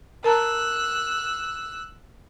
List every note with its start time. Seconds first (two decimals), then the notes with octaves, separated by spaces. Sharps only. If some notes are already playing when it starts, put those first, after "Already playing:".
0.24 A#4 A5 A#5 E6 F#6